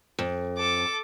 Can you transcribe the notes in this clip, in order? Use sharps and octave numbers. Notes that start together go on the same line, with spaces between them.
F2
A4 D6